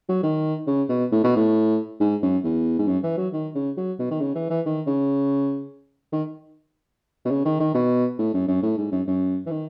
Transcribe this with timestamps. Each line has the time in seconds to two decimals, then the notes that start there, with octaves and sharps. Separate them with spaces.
0.09 F#3
0.23 D#3
0.67 C#3
0.89 B2
1.12 A2
1.24 B2
1.36 A2
2.00 G#2
2.22 F#2
2.44 E2
2.79 G#2
2.88 F#2
3.03 E3
3.18 F#3
3.33 D#3
3.55 C#3
3.77 F#3
3.99 B2
4.11 D#3
4.21 C#3
4.35 E3
4.50 E3
4.66 D#3
4.87 C#3
6.12 D#3
7.25 B2
7.31 C#3
7.45 D#3
7.60 D#3
7.74 B2
8.19 A2
8.34 F#2
8.48 F#2
8.62 A2
8.77 G#2
8.92 F#2
9.07 F#2
9.46 E3
9.51 D#3